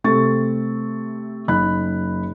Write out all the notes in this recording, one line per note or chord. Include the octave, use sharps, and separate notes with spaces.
C3 A3 C4 A4 C#6 A6
F#1 D#4 D#5 B5 F#6